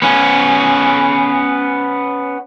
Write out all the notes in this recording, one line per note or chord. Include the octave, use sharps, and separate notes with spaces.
B3 C#4